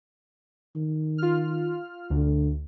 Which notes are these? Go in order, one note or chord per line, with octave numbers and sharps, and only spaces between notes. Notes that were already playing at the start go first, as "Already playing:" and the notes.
D#3
F4 F6
D2 D3